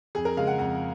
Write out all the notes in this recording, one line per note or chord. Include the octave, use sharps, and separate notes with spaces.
F2 G#4
A#4
C#3 G#3 F5
F#5
F2 F#5